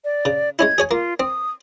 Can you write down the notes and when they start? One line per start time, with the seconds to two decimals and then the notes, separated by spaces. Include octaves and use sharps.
0.05 D5
0.25 C#3
0.59 G#3 C#4 E4 G#6
0.78 G#4 C#5 G#5
0.91 A#3 F4
1.20 C4 D#6